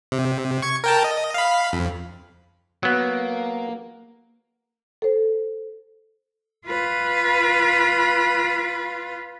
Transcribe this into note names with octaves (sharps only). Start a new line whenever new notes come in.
C3
C#6 G#6
A#4 G5 A5
D#5
F5 B5
F2
F#3 A#3 B3
A4 C5
F4 B4